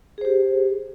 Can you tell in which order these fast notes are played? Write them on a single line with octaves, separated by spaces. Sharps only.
G#4 C5 G4